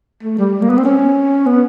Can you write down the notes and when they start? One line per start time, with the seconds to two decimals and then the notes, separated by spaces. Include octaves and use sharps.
0.23 A3
0.38 G3
0.62 A#3
0.70 B3
0.77 C4
0.85 C#4
1.46 B3